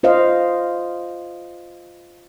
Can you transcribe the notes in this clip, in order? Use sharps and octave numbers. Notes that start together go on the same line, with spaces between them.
F4 C5 D#5 F5